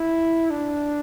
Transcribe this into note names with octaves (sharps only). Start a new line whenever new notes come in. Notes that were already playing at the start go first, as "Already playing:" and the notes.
Already playing: E4
D4